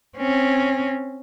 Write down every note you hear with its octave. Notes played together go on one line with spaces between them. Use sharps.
C4 C#4